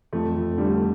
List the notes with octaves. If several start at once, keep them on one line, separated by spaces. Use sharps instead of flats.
F2 A3
F2
D3 G3
A3